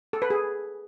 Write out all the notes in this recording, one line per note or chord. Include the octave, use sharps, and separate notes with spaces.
A4
B4
G#4